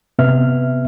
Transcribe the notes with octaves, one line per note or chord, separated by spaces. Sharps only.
C3 B3 E5 F6